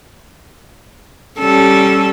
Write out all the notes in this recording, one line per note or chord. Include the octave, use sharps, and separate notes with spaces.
G3 C#4 A4